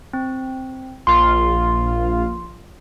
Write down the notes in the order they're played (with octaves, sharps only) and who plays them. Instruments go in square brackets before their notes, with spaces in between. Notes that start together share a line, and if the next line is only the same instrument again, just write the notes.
[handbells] C4
[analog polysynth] A#1 F4 [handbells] C6